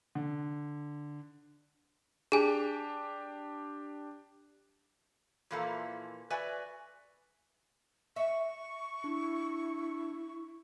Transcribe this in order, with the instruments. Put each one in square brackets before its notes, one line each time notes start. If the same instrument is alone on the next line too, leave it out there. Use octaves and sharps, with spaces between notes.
[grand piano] D3
[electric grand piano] D4 G4 [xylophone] G#4 G#5
[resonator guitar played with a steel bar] A#2 E3 F3 A#3 E4 A4
F#4 B4 D5 E5 G#5
[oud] E5 [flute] C#6
[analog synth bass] D4 [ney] E4